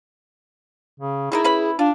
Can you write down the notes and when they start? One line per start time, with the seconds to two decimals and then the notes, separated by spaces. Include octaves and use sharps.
1.00 C#3
1.32 A3 D#4 E4 G#4 A#4
1.44 C#4 B4 B5
1.79 D4 F4 F5